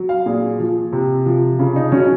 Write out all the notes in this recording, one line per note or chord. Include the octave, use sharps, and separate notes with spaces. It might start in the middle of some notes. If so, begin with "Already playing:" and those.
Already playing: F#3
F5
A#2 G#4
F3
C3
F3
C#3
D#4
F#3 C#4